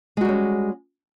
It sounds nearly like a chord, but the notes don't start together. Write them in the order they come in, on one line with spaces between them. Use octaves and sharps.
G#3 F#4 G3 C#4